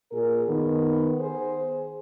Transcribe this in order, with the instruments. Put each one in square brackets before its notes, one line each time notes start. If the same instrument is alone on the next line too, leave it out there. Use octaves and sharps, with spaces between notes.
[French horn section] A#2 G#4 A#4
D#3 B3
G#4 C5